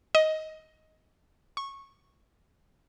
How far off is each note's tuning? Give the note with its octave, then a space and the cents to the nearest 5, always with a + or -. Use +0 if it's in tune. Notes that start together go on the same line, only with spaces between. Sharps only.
D#5 +10
C#6 -15